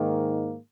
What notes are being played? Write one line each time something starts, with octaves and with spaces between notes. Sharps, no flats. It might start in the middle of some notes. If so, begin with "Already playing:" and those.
Already playing: G#2 D#3 A#3